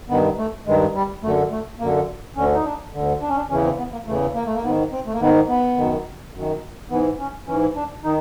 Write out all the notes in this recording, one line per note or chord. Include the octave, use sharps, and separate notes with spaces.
G2 D#3 B3
A3
G2 D#3 G#3
G3
F#2 D3 A3
A3
F#2 D3 A#3
D2 D3 C#4
D#4
D4
D2 D3
D4
C#4
D4
E2 C#3 E3 C#4
C4
B3
A#3
E2 C#3 E3 A3
A#3
A3
A#3
G#2 D#3 B3
C4
A3
A#3
G#2 D#3 B3
B3
F#2 D#3
F#2 D#3
G#2 E3 B3
C#4
G#2 E3 C#4
D4
D#3 D#4